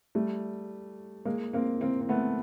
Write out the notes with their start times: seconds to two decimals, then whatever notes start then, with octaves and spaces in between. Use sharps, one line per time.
0.15 G3 A3
1.25 G#3 A#3
1.53 A#3 C4
1.81 A#3 C4
2.01 C4
2.09 A3 B3